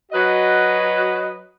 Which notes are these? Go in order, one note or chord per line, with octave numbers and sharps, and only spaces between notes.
F#3 F#4 B4 D#5